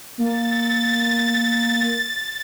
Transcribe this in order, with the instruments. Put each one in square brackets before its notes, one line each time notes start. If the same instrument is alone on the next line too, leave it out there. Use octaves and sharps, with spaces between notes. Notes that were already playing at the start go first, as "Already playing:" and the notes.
[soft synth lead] A#3 [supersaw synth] A6